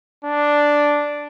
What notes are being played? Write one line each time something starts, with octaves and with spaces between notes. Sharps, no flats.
D4